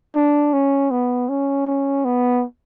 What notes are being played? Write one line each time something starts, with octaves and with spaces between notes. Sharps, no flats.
D4
C#4
B3
C#4
C#4
B3